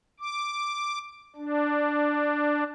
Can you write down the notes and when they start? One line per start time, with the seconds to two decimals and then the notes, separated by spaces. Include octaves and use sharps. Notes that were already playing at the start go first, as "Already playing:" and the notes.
0.20 D6
1.36 D4